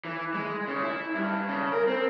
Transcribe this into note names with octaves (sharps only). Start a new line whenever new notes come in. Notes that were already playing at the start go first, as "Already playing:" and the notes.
E3
G#3
C#3
E4
G2
C#3
A#4
C4